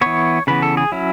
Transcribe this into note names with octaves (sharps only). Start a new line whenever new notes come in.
E3 B3 C#5
C#3 E3 B3 B4
A4
G#4
F#3 C#4 E4